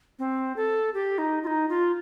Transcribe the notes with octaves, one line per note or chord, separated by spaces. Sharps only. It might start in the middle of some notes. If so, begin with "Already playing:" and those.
C4
A4
G4
D#4
F4
D#4
F4